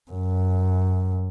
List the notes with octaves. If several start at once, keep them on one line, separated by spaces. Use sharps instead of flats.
F#2